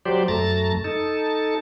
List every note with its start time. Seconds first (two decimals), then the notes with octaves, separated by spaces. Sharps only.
0.05 F#3 G4 C5 D5
0.28 F#2 A3 A5 A#5 A6
0.84 D#4 A4 A5